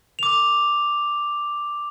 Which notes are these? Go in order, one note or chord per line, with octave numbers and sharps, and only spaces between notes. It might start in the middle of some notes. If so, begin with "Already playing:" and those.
D6 F7